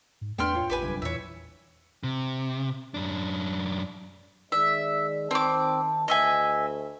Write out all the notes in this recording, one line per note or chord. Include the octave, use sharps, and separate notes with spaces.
G#2
E2 A3 B3 D4 G5 C6 F6
A2 F4 C#5
A1 G4 B4 G#5
C2 F#2 D3
E2 A#2 D#3 E3 C#5 E5
C3
F#2 D4
D#3 G#3 D5 E5
D#3 C4 A5 D6
D2 D#5 E5 G#5